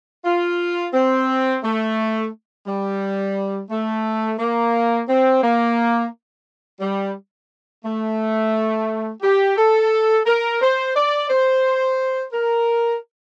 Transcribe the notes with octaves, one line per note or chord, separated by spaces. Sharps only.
F4
C4
A3
G3
A3
A#3
C4
A#3
G3
A3
G4
A4
A#4
C5
D5
C5
A#4